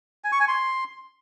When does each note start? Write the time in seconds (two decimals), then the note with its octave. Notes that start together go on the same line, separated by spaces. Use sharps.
0.24 G#5
0.32 C#6
0.40 G#5
0.48 C6